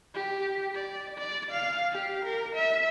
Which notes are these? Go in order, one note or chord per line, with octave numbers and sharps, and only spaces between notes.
G4
D5
D5
F5
G4
A#4
E5